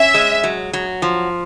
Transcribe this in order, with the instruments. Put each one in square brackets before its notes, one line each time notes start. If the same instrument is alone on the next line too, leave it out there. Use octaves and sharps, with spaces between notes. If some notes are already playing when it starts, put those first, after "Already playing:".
Already playing: [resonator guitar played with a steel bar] C#4 [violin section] E5
[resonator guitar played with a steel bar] G#3
F#3
F#3
F3